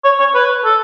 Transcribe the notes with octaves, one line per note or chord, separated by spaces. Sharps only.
C#5
C#5
B4
A4